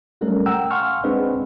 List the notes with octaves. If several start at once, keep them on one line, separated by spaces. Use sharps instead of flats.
F#3 G3 A3 C#4 A#4
F#5 G5 A#5 E6
F5 F#5 G#5 C6 C#6 F6
G#3 C4 D4 G#4 B4 D#5